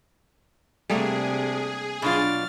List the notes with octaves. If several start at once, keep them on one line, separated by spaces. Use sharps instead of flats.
C3 G3 A3 A#3 D4 G#4
B2 F#3 D4 F4 F6 A6